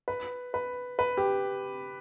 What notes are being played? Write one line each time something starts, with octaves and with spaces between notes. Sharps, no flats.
B4
B4
B4
G4